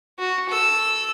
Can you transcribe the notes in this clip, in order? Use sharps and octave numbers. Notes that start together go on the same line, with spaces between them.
F#4
A4 E6